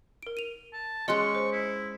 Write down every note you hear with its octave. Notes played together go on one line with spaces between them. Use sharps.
A#4 D7
D#7 F7
A5
G#3 C#4 D#5 C6 C#6 F#6
C5
E4